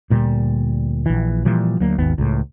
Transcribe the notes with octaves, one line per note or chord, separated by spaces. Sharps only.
D2 A#2 G3
A#1 E3
A#2 E3 F3 G3
D2 F#3 A#3
G#1 D#2 B3
C#2 A2